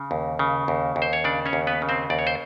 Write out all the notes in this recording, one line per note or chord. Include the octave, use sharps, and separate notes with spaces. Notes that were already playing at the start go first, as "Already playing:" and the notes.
Already playing: C#3
D#2
C#3
D#2
D#2
C5
C#5
C#3 D4 D5
C#4 C#5
D#2
B3 B4
C#3
C4 C5
D#2 D5
C#5
C5